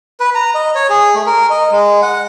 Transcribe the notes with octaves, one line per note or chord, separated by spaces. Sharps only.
B4
A#5
D#5
C#5
G#4
A3
A#4
D#5
G#3
F#5